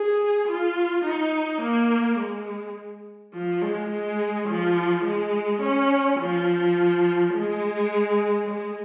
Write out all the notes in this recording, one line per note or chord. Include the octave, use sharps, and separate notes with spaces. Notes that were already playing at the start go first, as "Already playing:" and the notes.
Already playing: G#4
F4
D#4
A#3
G#3
F3
G#3
G#3
F3
G#3
C#4
F3
G#3
G#3